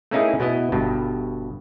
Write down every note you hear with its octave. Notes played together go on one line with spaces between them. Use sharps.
A3 A#3 C#4 D#4 E4 G#4
B2 B3 E4 D#5
G1 G2 B2